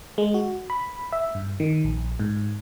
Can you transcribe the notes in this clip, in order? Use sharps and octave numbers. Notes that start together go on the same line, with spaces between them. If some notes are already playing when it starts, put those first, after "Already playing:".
G#3
F#4
B5
E5
G2
D#3
A#1
G#2